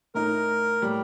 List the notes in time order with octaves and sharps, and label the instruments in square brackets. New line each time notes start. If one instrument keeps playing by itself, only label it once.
[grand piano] A2 A3 D#4 [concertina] A#4
[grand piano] A2 G3